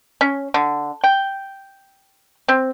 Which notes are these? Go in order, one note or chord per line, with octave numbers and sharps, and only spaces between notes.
C#4
D3
G5
C4